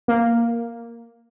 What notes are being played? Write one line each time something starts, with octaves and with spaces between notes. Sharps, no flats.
A#3